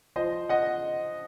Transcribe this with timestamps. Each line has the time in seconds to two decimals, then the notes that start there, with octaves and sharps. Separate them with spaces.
0.16 F3 C5 D#5
0.49 D#5 F#5